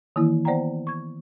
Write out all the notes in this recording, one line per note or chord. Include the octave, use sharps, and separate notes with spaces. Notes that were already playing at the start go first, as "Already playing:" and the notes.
D#3 E3 A#3 E4
B3 C5 D5 F#5 G5 A#5
C#6 G#6